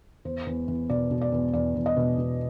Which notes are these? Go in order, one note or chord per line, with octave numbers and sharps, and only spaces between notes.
E2 C5
E2
E2
B2 D5
B2
D5
E2
E2 D5
E2
D#5
B2
B2